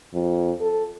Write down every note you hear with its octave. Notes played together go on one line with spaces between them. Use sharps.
F2
A4